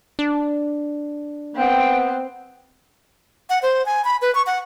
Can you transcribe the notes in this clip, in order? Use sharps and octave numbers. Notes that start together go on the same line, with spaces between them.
D4
B3 C4 G5
F#5
C5
G#5
B5
B4
C#6
F#5